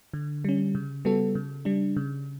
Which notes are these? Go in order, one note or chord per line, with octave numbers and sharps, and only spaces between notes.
D3
G3 C#4
C#3
G3 B3 F#4 A4
C#3
G3 D4
C#3